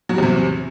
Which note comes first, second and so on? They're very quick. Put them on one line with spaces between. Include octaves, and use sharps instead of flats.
F#3 G3 E2 C3